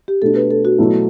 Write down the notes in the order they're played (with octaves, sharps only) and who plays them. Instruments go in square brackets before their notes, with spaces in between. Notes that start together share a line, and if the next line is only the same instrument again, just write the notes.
[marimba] G4
[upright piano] B2 A3 D4 [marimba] A4
[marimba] B4
A4
F#4
[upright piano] B2 F#3 A3 E4